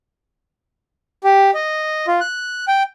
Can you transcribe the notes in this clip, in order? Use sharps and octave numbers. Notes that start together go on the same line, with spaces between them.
G4
D#5
F4
F#6
G5